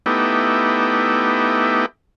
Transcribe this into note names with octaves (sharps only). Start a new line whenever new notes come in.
A3 B3 D#4 E4 G4